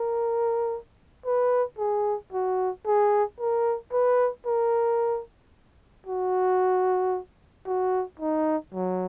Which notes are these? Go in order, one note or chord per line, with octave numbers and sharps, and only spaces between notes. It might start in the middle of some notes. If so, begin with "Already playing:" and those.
Already playing: A#4
B4
G#4
F#4
G#4
A#4
B4
A#4
F#4
F#4
D#4
F#3